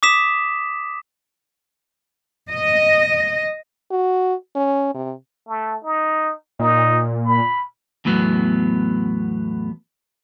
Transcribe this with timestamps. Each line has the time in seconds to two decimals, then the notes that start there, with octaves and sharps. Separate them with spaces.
0.03 D6 D#6 B6 E7
2.52 D#5
3.91 F#4
4.56 C#4
4.94 C3
5.47 A3
5.83 D#4
6.60 A#2 D#4
7.25 B5
8.05 E2 A2 F#3 B3